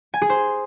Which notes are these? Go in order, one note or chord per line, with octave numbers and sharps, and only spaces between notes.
G#5
G#4
C5